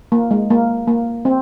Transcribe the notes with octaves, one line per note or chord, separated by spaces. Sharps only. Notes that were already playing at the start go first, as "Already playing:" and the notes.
A#3
G#3
A#3
A#3
C4